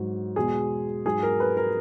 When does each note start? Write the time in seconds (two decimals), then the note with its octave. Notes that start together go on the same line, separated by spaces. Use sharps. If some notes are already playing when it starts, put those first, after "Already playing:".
Already playing: G#2 F#3
0.36 E2 B2 G#3 G#4
1.05 G#2 F#3 G#4
1.23 A#4
1.40 B4
1.57 A#4